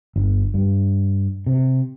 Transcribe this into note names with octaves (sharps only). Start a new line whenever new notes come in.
G1
G2
C3